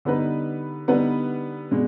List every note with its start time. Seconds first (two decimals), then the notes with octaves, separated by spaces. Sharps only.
0.05 D3 G3 B3 D#4 B4
0.88 D3 G3 B3 D#4 B4
1.71 B2 G#3 D4